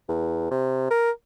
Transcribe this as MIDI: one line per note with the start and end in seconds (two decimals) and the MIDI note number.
0.09 0.49 40
0.51 0.88 48
0.91 1.11 70